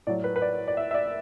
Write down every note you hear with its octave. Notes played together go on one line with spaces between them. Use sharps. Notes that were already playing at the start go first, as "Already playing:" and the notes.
A2 F#3 D5
B4
B4
D5
D5
E5
E5
D5